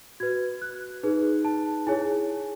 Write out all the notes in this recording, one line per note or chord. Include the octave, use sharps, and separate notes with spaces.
F#4 B4 G#6
F#6
D#4 G#4 B4
A5
E4 G#4 C#5 G#5